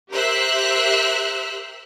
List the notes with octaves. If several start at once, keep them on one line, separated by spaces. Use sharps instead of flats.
G4 A#4 C5 E5 E6 F#6